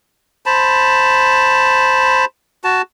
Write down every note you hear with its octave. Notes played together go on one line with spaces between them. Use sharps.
C5 A5 B5
F#4 A5